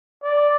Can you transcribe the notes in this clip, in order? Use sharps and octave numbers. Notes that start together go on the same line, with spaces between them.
D5